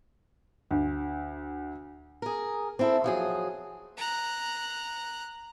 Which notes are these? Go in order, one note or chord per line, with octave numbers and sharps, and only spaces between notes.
D2
G#4 A#4
C4 E4 A4
F3 F#3 G#4
A#5 F#6